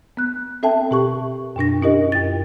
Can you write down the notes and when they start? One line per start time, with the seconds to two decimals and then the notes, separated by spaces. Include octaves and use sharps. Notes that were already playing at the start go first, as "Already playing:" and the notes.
0.17 B3 F#6
0.63 C4 A4 E5 G5 A5
0.91 B2 G4 C#6
1.56 F#2 B2 D4 A#6
1.82 C#4 D4 E4 G4 A#4 D#5
2.12 F#2 A6